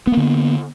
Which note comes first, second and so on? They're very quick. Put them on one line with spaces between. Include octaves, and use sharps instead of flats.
B3 A#3 D3